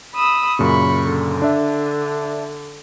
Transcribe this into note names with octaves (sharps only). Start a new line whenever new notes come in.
B5 D#6 E6
F#2 A#2 C#3 B5 C#6
D3
D4 E5